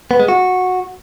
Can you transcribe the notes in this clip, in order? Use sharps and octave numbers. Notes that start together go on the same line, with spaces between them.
B3
G#3
F#4